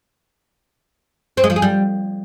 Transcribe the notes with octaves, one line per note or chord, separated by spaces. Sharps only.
C4
G#3
F3
G#4
G3